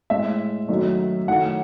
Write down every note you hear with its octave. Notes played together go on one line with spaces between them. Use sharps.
A2 G#3 E5
F#2 D#3 F#3 A3
F#2 D#3 A3 F#5